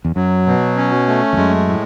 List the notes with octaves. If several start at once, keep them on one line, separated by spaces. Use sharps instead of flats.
E2
F#2 F#3
B2
C#4
A3
E2
F#2 G#3
A2